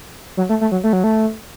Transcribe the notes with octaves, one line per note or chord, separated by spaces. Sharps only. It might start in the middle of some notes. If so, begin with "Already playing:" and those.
F#3
A3
A3
F#3
A3
F#3
A3